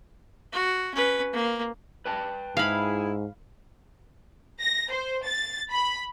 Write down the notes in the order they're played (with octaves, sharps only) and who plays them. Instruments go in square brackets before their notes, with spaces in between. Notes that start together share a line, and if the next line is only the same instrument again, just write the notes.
[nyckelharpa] F#4
C#4 B4
A#3
[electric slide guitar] B4 G5 A5
[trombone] G#2 [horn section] E4 G#4 [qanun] F5 B5
[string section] A#6
C5
A6
B5